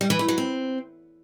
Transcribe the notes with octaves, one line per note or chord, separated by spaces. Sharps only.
G3
E3
A3
F#3
C4